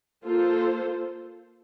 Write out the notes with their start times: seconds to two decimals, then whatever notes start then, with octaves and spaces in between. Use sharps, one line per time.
0.24 A#3 F4 A4 C5